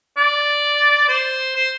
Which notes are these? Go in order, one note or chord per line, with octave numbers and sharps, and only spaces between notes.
D5
C5
C5